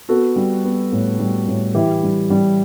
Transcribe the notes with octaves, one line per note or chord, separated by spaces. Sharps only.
B3 F#4 A4
G3
B3
A2
G3
A2
E3 E4 G4
G3
G3